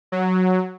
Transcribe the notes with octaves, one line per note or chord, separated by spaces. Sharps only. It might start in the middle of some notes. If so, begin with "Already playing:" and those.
F#3